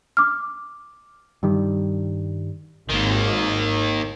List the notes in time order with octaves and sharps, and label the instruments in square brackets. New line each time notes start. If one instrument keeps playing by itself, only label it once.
[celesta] D6 F6
[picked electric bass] G2 D#3 G3
[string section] G#1 [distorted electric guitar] D#2 D#3